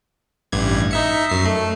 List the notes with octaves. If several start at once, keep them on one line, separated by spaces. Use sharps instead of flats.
A1 G2 G#6
D#4 E5 C#7
F#2 C7
A3